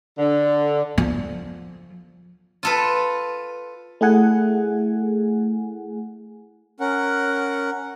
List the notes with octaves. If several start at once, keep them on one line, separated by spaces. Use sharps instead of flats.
D3
F3
F4 A4 B4
A3 E4 G#4 F#5 G#5
C#4 A#4 F#5